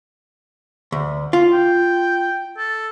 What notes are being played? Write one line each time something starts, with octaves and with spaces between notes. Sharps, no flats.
D2
F4
G5
A4